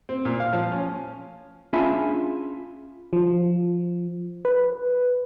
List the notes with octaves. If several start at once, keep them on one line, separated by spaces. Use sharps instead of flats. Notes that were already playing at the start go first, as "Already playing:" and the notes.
C4
A#2
F5
F3
C#4
C#4 D4 F4 G#4 E5 B5
F3
B4